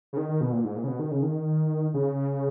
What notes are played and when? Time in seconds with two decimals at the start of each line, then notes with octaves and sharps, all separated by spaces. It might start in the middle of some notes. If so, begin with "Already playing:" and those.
0.13 C#3
0.17 D#3
0.29 D#3
0.41 B2
0.52 A#2
0.64 G#2
0.76 A#2
0.84 C#3
0.87 B2
0.99 D#3
1.11 C#3
1.23 D#3
1.94 C#3